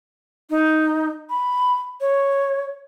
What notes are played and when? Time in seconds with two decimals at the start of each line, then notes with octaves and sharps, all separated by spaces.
0.50 D#4
1.30 B5
2.01 C#5